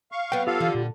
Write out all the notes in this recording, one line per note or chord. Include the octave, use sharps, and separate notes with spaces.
F5 C#6
F#3 B3 G5
F4 G4 A4 F5
D3 E3
A#2 G3